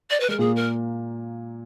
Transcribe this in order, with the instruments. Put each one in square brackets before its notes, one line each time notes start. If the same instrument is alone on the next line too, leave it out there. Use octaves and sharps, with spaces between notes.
[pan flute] D5
B4
[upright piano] G#3 [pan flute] A#4
[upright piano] A#2 A#3 [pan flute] G#4
[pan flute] A#4